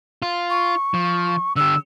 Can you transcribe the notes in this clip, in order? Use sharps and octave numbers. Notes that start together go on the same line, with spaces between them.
F4
C#6
F3
D3 G4 E6